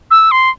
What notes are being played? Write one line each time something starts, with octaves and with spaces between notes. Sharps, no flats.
E6
C6